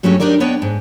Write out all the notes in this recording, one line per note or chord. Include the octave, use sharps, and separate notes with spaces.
G2 F#3 G#3 A3 C#4 G4
D4 D#4 G4 A#4 D5
B3 D4 C#5 D#5 G5
G#2